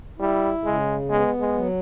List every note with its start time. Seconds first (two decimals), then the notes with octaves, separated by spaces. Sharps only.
0.19 G3 E4
0.64 C#3 G#3
1.10 G#3 B3
1.40 G#3
1.56 F#3